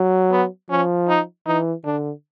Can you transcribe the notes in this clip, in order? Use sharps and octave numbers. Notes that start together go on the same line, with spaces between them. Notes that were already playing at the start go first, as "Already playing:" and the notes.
Already playing: F#3
B3
F3 C#4
D#4
E3 D#4
D3 D4